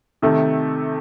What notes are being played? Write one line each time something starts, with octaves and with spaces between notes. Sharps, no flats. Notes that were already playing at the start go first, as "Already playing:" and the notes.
C3 D#3 A3